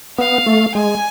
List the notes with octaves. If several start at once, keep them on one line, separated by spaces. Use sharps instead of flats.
B3 F5
A3
G#3 G#5